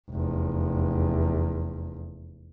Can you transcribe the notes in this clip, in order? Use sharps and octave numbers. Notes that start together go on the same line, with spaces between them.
F1 E2